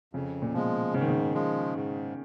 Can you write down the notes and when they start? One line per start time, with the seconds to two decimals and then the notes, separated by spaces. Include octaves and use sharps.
0.13 F2 C#3
0.42 A#2
0.54 B2 F3 G#3
0.93 G#2 C#3
1.01 D#3
1.08 C#3
1.34 F3 G#3
1.74 G#2